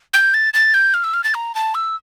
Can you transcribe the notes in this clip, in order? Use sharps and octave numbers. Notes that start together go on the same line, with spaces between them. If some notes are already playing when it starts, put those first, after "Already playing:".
G6
A6
A6
G6
F6
E6
F6
A6
A#5
A5
E6